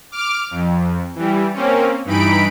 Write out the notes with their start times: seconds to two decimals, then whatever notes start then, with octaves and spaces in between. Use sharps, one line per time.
0.12 D6 F6
0.51 F2
1.15 E3 G3
1.54 A#3 C4 C#4
2.05 G2 E3 D#4 B5 D7